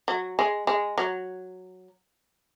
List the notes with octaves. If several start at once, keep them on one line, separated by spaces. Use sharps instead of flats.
F#3
G#3
G#3
F#3